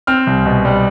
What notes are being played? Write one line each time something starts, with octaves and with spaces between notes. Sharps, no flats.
C4 F6
C2
B2
G3